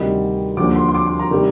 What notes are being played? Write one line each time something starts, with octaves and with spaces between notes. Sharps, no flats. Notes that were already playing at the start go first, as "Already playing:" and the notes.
Already playing: D2 C3 D#3 G3 D#5
D#2 D3 F3 D6
C6
C6
D6
C6
A#5
C3 D#3 G3